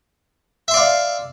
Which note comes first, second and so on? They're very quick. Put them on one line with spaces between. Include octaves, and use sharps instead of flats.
E5 C6 D5 F5